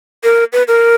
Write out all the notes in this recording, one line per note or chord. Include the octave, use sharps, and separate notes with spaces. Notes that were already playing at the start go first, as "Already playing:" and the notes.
A#4
B4
A#4